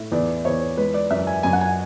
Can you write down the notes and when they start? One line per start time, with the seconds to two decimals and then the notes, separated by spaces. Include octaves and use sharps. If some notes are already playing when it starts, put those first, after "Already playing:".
Already playing: A2
0.12 E2 D5
0.45 E2 C#5
0.77 G#3 B4
0.94 D5
1.11 F#2 E5
1.27 G#5
1.43 F#2 G#5
1.53 F#5
1.61 G#5